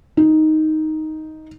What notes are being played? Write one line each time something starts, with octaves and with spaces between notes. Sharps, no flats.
D#4